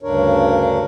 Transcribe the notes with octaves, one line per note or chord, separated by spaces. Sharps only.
D2 G2 C#3 D4 A#4 C#5